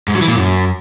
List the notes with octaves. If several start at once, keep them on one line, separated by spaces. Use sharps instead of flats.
G#2
F#3
E3
A#2
F#2